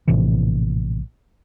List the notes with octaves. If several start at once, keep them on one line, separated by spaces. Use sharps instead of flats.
A#1 A2 C3 E3